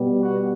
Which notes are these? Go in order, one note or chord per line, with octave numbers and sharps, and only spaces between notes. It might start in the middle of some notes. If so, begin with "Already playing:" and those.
Already playing: B2 G3 B3
F#4